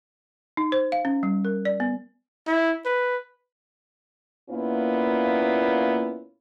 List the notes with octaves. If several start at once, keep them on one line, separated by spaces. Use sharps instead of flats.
D#4
C5
F5
C#4
G3
A#4
D5
B3
E4
B4
A#2 A#3 B3 C#4 E4 F4